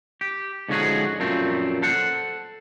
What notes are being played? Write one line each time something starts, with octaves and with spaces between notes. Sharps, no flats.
G4
G#2 D3 F3 C#4 F#4 G#4
F#2 A#2 F3 A3 C4
A4 C5 F#5